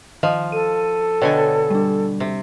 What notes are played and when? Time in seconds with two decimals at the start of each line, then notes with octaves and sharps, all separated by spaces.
0.23 D#3 F3 D#5 F5
0.52 A4 D#7
1.22 B2 D3 C#5 D#5 G5 G#5
1.70 G3 D4
2.20 C3